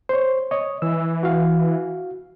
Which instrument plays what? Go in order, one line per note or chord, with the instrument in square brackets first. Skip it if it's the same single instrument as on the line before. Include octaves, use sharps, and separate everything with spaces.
[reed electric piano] C5 C#5
C#5 D#5
[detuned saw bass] E3 [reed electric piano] E6
[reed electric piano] F#4 F5